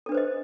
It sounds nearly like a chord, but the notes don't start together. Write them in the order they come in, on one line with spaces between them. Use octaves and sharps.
A4 D4 B4 C5 D#5